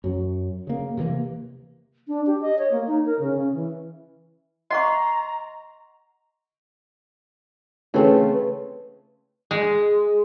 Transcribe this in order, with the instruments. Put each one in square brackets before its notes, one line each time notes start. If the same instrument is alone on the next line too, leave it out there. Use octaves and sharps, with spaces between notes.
[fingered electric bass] F#2 F#3
C#3 A#3
C3 E3 G3 A#3
[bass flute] D4
G4
D#5
C#5
A#3
D#4
A#4
C#3
C#4
E3
[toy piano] D#5 F#5 C#6 [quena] A#5 [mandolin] C6
[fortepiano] C#3 A3 C#4 [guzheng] E3 C4 F4
[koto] G#3